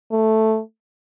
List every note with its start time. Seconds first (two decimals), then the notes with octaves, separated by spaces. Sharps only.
0.12 A3